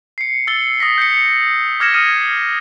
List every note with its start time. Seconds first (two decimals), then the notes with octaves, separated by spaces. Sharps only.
0.18 C7 C#7
0.47 E6 A6 C#7 G7
0.80 D#6 A#6 B6
0.98 G6 C#7
1.80 D6 F6 G#6 A#6 C#7 E7
1.94 D#6 F6 A#6 D#7